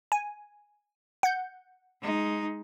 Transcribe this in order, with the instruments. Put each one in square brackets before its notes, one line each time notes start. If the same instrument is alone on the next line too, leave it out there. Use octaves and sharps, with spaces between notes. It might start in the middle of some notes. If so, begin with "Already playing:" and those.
[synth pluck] G#5
F#5 G6
[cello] G#3 D#4